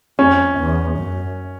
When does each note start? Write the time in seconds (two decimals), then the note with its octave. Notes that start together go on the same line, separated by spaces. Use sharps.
0.19 F2 C#4
0.58 E2
0.98 F#2